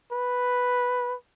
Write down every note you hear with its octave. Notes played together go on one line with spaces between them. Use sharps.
B4